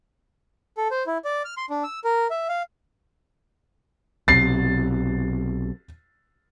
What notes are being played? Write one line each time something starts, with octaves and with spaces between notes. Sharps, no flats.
A4
C5
E4
D5
F6
C6
D4
E6
A#4
E5
F5
B1 C3 A6 C7